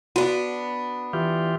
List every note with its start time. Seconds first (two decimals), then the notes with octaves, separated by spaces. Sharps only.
0.16 B3 D4 F#4
1.13 E3 F4 G4